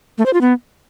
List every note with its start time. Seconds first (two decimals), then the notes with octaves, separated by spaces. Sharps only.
0.18 A3
0.26 C5
0.33 F4
0.41 B3